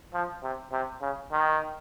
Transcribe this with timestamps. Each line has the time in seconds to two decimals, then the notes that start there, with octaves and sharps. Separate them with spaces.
0.14 F3
0.43 C3
0.72 C3
1.02 C#3
1.32 D#3